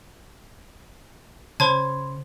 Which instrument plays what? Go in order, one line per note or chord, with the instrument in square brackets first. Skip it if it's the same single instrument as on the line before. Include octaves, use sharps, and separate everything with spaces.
[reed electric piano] C#3 [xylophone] C5 C#5 A5 [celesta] B5 C6 G#6